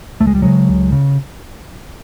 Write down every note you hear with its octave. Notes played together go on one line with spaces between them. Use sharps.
C#2 A3
G#3
G3
C#3 F#3 G#3
C#2
C#3